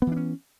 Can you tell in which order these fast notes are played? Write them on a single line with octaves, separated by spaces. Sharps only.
B3 E3 D4 C#4